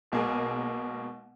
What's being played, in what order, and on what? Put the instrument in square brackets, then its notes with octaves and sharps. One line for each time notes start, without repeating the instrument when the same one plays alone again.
[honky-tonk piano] B1 B2 G#3 A#3 G#5